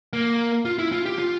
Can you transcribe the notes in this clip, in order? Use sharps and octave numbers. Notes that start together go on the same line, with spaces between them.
A#3
F4
E4
F4
G4
F4